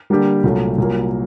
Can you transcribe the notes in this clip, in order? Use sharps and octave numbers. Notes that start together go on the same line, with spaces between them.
D3 G3 A#3 D4 G4
C2 A#2 F#3 A3
C2 A#2 F#3 A#3